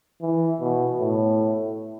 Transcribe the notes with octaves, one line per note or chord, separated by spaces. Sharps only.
E3
B2
A2